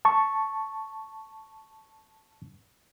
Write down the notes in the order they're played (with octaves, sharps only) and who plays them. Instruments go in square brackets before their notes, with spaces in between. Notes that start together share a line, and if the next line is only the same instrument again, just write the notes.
[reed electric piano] A5 C#6